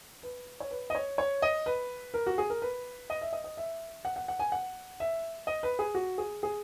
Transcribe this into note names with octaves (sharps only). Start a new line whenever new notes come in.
B4
C#5
B4
D#5
C#5
C#5
D#5
B4
A#4
F#4
G#4
A#4
B4
D#5
E5
D#5
D#5
E5
F#5
F#5
F#5
G#5
F#5
E5
D#5
B4
G#4
F#4
G#4
G#4